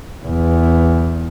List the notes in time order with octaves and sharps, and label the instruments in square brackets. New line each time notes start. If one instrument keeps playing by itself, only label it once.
[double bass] E2